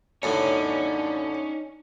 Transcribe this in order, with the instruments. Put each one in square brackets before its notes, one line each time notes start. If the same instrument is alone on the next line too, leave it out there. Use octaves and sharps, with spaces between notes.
[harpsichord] F#2 A2 [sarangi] D3 [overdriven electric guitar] C#4 [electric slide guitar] D#4 C#5